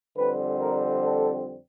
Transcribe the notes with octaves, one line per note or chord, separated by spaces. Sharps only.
F2 D3 G3 C4 B4
A#4
A4